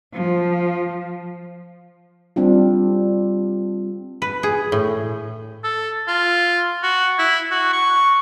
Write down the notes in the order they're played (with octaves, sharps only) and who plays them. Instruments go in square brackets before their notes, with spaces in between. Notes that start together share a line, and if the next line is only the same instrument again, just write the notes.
[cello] F3
[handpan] G3 C4 D4 F4
[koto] B4
G#4
A2
[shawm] A4
F4
F#4
E4
F#4
C#6